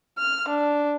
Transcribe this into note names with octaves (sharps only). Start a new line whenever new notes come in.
F6
D4